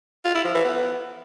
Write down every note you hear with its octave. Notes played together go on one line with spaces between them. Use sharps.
F4
E4
F3
E3
B3